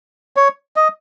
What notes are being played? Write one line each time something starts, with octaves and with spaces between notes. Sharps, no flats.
C#5
D#5